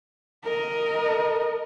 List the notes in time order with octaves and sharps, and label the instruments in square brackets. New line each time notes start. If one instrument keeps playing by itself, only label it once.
[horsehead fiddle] A#4 D#5